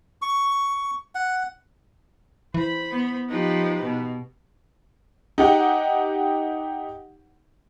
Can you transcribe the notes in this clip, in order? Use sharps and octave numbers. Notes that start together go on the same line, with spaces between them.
C#6
F#5
E3 C5 B5
B3
F3 D#4 G4 B4
B2
D#4 G4 F#5 G5